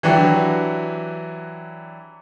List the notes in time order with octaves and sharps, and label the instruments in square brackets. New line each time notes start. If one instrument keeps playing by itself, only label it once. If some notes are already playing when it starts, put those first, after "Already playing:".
[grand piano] E3 F#3 D4 F#4 G4